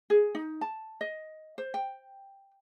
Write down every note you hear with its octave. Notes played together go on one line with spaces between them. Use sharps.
G#4
D#4
A5
D#5
C5
G5